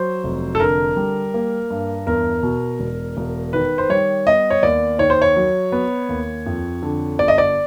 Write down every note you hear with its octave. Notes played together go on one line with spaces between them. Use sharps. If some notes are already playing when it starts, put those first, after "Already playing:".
Already playing: F#3 C5
F1
A4
D3 A#4
G3
A#3
G2
E2 A#4
B2
E1
E1
D#3 B4
C5
G3 C#5
B3 D#5
C#5
D#2 D5
D#3 C#5
C5
C#5
F#3
B3
D#2
F2
D3
G1 D5
D#5
D5